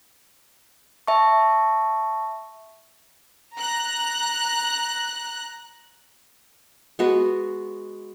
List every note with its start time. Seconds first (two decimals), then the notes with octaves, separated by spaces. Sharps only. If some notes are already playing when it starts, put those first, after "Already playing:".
1.07 E5 A5 C#6
3.55 A#5 F#6
6.99 G#3 B3 F#4